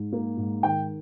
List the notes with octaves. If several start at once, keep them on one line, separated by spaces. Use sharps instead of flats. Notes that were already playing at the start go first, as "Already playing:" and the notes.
Already playing: G#2
A#3
G#2
D#3 G5